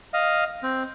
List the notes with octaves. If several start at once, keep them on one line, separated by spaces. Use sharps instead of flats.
D#5 F5
C4